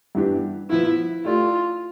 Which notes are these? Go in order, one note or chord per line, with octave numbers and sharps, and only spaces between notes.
G2 E3 B3 D4 G4
F3 B3 E4 F4
A3 E4 F4 G4 D5